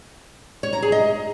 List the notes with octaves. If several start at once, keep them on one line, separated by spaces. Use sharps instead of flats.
C#5
A#5
G#4
D#5